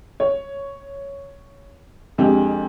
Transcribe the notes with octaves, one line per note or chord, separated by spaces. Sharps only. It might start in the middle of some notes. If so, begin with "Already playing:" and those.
C#5
F2 G#3 D4 G4